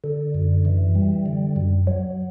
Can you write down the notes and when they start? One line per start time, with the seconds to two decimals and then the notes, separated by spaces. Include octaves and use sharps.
0.04 D3
0.34 F#2
0.65 E3
0.95 G3
1.26 D3
1.56 F#2
1.87 F#3